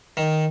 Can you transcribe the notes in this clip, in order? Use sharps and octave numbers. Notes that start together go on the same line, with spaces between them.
D#3